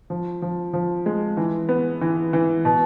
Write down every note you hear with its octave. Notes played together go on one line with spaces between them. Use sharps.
F3
F3
F3
G#3
E3
B3
E3
E3
B2